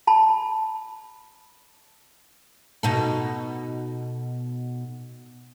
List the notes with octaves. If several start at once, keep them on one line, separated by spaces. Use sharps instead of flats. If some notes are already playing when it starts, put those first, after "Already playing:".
A5 B5
B2 D#4 A4